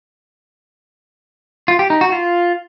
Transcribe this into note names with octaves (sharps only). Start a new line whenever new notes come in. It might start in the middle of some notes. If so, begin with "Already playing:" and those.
F4
G4
D#4
F#4
F4